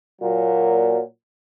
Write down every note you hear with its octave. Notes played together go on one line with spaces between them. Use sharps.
A#2 F#3